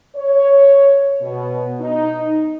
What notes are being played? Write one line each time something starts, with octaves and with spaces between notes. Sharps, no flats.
C#5
B2
D#4